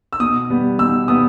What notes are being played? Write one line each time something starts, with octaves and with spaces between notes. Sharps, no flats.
E6
B2 D#6
G3 B3
B2 E6
G3 B3 D#6